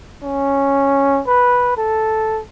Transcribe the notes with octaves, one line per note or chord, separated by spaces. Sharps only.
C#4
B4
A4